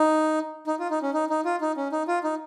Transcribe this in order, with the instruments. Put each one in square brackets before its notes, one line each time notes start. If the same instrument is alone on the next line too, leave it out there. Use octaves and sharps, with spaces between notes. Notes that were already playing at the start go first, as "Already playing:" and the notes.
Already playing: [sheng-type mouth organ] D#4
D#4
F4
D#4
C#4
D#4
D#4
F4
D#4
C#4
D#4
F4
D#4